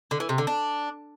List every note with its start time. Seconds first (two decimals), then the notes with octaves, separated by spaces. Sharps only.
0.11 D3
0.20 E3
0.29 C3
0.38 D3
0.47 D4